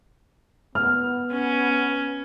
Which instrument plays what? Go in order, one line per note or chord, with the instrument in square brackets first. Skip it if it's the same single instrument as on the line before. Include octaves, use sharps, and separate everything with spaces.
[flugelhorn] B3 [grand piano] F6
[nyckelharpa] C#4